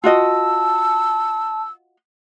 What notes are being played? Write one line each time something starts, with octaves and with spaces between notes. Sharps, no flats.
F4 F#4 D#5 A5 E6